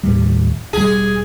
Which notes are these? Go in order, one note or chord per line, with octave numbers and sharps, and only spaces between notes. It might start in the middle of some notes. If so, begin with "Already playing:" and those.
D#2 A2 G3
E1 G3 G#4